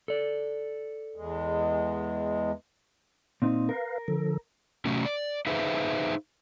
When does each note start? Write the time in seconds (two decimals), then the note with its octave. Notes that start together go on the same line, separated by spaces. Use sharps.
0.08 A4 D5
1.16 E2 G#3
3.42 A#2 C4 D#4
3.69 A#4 B4 F5
4.08 D3 F3 A4
4.85 C3 F#3 A3 C#4
5.05 D5
5.47 D#4 G#4 B4 C5 E5 F5